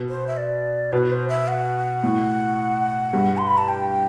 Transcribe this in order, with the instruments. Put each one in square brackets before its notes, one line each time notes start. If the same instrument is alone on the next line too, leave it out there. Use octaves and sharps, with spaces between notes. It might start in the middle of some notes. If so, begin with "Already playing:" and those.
Already playing: [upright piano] B2
[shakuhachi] C5
E5
D5
[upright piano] B2 [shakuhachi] B4
[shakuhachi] C5
E5
F#5
[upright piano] A2
G2
[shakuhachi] C6
B5
A5
G5